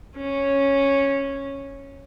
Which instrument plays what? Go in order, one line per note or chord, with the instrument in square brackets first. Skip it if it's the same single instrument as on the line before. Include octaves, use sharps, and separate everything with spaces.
[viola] C#4